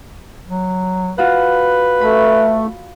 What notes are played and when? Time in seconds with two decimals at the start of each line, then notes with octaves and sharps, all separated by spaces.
0.48 F#3
1.18 F4 F#4 B4 F#5
2.01 A3 B5